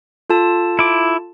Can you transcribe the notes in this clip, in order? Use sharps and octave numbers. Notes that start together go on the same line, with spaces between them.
F4 A4 A5
E4 D6